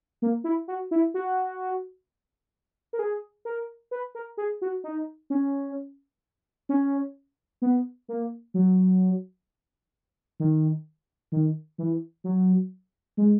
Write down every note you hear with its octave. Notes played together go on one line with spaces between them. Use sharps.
A#3
E4
F#4
E4
F#4
A#4
G#4
A#4
B4
A#4
G#4
F#4
D#4
C#4
C#4
B3
A#3
F#3
D#3
D#3
E3
F#3
G#3